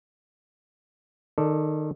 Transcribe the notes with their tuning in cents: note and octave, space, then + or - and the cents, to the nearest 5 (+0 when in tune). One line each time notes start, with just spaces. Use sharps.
D#3 -15 A4 +0 D5 +0